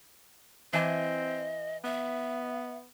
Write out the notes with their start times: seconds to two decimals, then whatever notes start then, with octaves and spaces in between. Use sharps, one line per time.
0.73 E3 C4 D#5 G#5
1.84 B3 E5